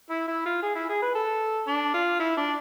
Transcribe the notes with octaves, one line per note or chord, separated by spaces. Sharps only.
E4
E4
F4
G#4
E4
G#4
B4
A4
D4
F4
E4
D4